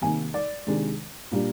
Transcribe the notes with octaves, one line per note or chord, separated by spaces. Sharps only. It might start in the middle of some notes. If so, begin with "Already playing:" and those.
C3 D#3 A#3 D#4 G#5
D5
C3 D#3 G#3 D4
A#2 G3 A#3 D4